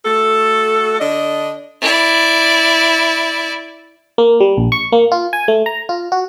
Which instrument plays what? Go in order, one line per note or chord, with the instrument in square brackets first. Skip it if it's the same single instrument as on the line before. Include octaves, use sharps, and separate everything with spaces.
[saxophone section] A3 F#4 A4
D3 D4 D#5
[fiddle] E4 D5
[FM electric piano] A#3
G3
A#1
C#6
A#3
F4
G#5
A3
A#5
F4
F#4